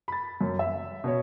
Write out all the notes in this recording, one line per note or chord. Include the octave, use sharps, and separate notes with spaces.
B5 A6
F#2
E5
B2 C#5